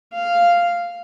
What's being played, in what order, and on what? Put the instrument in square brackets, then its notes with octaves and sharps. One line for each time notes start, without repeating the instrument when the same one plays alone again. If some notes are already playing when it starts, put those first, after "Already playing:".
[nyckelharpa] F5